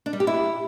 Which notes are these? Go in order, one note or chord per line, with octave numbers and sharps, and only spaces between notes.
D4
G3
G4
E4